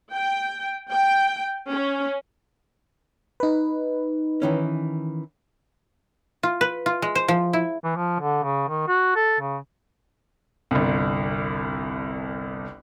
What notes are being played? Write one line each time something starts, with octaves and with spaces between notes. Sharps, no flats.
G5
G5
C#4
D#4 B4
D#3 E3 C#4
F4
B4
F4
G#3
C5
F3
E4
E3
F3
D3
C#3
D#3
F#4
A4
C#3
G1 C2